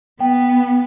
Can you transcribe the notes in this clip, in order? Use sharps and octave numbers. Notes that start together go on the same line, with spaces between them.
B3 G5